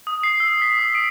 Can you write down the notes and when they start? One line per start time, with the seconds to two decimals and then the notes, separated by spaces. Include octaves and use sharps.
0.07 D#6
0.23 C7
0.40 E6
0.62 B6
0.79 D#6
0.95 D7